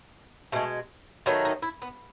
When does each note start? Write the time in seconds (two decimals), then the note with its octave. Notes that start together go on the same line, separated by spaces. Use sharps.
0.52 B2 G#3 A3
1.26 D#3 F#3 A3 B3
1.45 D#4
1.62 E4
1.82 B3